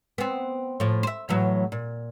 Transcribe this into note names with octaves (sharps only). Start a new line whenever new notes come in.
B3 C4
A2 F3
C5 E5
A2 E3 F#3
A#2